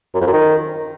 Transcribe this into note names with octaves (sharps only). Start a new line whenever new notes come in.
F#2
F2
F#2
D#3